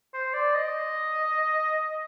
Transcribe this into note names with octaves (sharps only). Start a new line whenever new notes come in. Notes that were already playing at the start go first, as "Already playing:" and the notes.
C5
D5
D#5